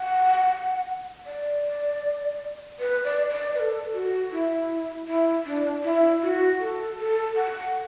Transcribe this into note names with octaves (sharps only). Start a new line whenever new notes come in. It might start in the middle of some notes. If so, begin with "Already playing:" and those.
Already playing: F#5
D5
B4
D5
D5
B4
A4
F#4
E4
E4
D4
E4
F#4
A4
A4
F#5